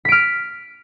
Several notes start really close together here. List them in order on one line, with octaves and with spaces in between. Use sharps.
B6 D7 F6